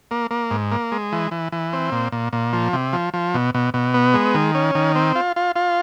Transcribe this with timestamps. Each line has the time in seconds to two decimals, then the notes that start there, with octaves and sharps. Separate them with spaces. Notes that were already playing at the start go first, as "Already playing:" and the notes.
0.11 A#3
0.31 A#3
0.51 G#2
0.72 A#3
0.92 G#3
1.12 E3
1.31 E3
1.52 E3
1.73 C4
1.92 A#2
2.12 A#2
2.33 A#2
2.53 F3
2.73 C3
2.93 F3
3.14 F3
3.34 B2
3.54 B2
3.74 B2
3.94 B3
4.14 G#3
4.34 D#3
4.55 C#4
4.75 D#3
4.95 C4
5.15 F4
5.36 F4
5.56 F4